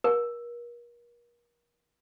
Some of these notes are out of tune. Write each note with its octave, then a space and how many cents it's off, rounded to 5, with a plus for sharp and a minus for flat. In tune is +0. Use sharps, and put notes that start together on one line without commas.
A#4 +40